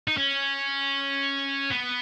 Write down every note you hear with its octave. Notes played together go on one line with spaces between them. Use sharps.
D#4
C#4
B3